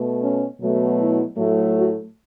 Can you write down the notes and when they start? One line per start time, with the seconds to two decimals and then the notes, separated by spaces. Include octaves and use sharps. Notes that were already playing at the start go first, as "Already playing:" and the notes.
Already playing: B2 A3
0.23 C#4
0.61 B2 F#3 A3
1.00 E4
1.37 A2 F#3 A3
1.75 F#4